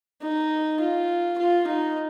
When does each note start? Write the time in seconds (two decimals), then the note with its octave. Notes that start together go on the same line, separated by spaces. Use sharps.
0.22 D#4
0.80 F4
1.38 F4
1.67 D#4